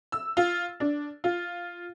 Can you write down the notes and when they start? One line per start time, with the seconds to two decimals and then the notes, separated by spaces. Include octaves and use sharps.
0.12 E6
0.37 F4
0.80 D4
1.24 F4